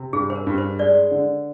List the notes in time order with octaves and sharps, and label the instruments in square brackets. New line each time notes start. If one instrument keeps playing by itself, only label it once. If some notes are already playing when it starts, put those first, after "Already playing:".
Already playing: [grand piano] C3
[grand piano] G2 [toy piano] G#4
[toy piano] C5
A#4
[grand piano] G2
[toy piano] C5
[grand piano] G#3 [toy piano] D5
[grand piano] D3